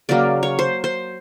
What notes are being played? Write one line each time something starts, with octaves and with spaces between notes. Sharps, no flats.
C#3 F#3 A#3 D5
C#5
C5
C5